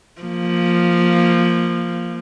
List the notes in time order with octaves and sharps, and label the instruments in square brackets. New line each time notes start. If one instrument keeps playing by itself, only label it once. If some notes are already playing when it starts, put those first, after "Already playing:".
[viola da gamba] F3 A#3